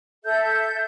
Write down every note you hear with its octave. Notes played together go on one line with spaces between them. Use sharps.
A4 E5 G6